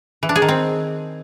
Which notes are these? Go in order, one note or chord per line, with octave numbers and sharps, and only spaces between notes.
E3
D4
G#4
D#3
C4